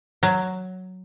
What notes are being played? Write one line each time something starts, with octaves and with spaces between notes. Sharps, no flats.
F#3